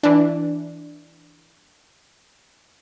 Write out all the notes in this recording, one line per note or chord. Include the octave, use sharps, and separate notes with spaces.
E3 D4